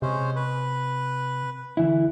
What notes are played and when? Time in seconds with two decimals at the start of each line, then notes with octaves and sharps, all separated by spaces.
0.02 C3 G#3 C#4 C5
0.36 B4
1.77 D2 E3 E4